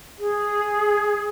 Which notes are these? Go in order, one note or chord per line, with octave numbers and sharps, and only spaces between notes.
G#4